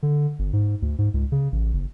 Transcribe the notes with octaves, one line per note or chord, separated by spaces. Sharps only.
D3
G1
G#2
D2
G#2
C#2
C#3
A1
F#1